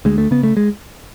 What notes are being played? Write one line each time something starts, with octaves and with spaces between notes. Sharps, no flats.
D2 G#3
A3
C#3 B3
A3
G#3